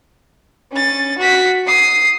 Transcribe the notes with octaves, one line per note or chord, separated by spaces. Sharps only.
C#4 A6
F#4 B6
D#6 C7